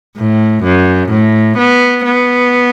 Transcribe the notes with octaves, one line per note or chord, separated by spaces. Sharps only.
A2
F#2
A2
B3
B3